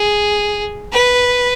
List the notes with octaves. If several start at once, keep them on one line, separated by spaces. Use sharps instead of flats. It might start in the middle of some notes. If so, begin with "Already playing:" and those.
Already playing: G#4
B4